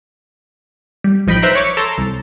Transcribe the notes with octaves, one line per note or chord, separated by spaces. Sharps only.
G3
A1 F3 D#4 G5 B5 D7
B4 C5 E5 G5 A#5 B5
C#5 C#6 D6
A4 A5 A#5 C6
C2